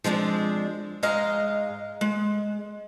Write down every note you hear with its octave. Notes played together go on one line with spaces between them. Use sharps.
F3 G#3 C4 D4
G#2 G#3 D#5 F5 A#5
G#3